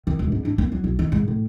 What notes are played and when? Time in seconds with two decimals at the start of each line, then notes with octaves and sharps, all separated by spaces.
0.07 D#3
0.19 D1
0.32 G#2
0.45 D4
0.58 A#3
0.72 F#3
0.84 B1
0.99 D#3
1.12 G#2
1.28 A2